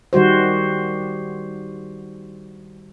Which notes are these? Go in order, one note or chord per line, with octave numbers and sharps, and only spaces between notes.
D#3 G3 F#4 C5